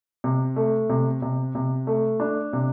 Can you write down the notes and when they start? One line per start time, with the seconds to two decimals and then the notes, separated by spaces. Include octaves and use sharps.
0.24 C3
0.56 A3
0.90 C3
1.22 C3
1.55 C3
1.87 A3
2.20 D4
2.53 C3